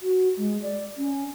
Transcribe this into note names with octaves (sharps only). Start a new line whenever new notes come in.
F#4
G#3
D5
C#4